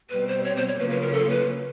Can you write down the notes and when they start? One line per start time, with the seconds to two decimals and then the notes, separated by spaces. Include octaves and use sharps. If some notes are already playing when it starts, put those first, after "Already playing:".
0.10 B2 G3 C4 B4
0.28 C5
0.44 C#5
0.56 C5
0.67 C#5
0.79 C#3 F#3 A#3 C#4 F4 B4
0.90 B4
1.02 A#4
1.13 A4
1.30 B4